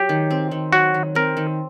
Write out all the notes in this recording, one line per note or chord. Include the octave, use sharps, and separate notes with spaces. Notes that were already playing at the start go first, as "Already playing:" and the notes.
Already playing: F#3 G4
D#3
C4
D#3
F#3 F#4
D#3
C4 A#4
D#3